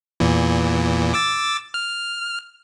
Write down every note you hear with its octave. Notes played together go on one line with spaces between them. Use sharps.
E2 A#2 E3
D6 E6 A6
F6